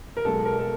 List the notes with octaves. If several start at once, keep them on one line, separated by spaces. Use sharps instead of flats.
A#4
B1 B2 G#3 A4
A#4
A4